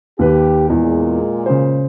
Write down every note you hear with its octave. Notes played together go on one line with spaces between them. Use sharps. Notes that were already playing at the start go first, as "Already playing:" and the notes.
D#2 G4 B4
E2 A#2 G#3
C#3 C5